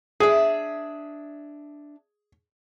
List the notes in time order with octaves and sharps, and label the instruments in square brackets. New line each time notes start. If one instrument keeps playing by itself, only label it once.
[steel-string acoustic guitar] D4 E5 [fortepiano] G#4